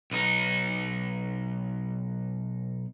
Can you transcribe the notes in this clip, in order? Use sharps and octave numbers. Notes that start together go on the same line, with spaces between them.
B1 D#4